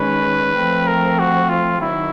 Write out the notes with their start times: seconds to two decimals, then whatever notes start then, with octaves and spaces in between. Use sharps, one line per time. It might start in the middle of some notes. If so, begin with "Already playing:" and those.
Already playing: D#3 G#3 C#4 B4
0.56 F3 A3 C4
0.87 A#4
1.19 F#4
1.49 F4
1.80 D#3 F#3 E4